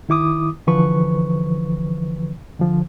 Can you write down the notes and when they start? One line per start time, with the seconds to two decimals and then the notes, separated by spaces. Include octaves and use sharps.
0.09 D#3 E4 D6 D#6
0.67 D3 E3 F3 B4 C#6
2.59 D3 F3